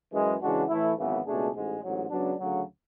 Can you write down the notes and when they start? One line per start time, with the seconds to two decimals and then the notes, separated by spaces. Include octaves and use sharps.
0.12 F#2 E3 G#3
0.40 C#3 E3 G#3 D4 F#4
0.68 A2 E3 A3 E4
0.98 G#1 F#2 C#3 E3 B3
1.26 C#2 B2 A3 D4 G#4
1.54 A1 G#2 G#3
1.82 A1 G#2 F#3
2.10 C#2 C#3 F#3 B3 D4
2.39 D2 C#3 F#3